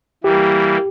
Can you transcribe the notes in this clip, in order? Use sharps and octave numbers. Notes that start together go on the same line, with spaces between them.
E3 G3 A#3 G4